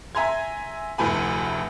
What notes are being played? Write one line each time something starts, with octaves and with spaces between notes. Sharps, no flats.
E5 G#5 A#5 C6 G#6
F1 D2 A2 A4 G#5 B5